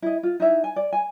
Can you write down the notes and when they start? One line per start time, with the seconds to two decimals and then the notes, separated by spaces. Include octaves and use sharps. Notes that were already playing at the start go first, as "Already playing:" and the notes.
0.02 E4 D#5
0.23 F4
0.40 D#4 E4 E5
0.64 G#5
0.76 D5
0.93 G#5